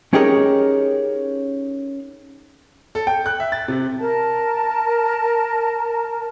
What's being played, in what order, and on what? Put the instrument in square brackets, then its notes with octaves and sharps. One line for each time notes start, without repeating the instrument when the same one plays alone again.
[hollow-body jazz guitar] C#4 D#4 G4 G#4 A#4 C#5
[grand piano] A4
G5
F#6
E5
A6
C3
[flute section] A#4 A5